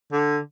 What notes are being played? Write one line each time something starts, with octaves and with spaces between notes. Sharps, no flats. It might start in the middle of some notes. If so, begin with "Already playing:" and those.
D3